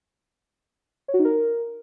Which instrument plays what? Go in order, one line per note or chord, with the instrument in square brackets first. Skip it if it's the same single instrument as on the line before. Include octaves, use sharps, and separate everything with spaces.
[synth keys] C#5
F#4
D#4
A#4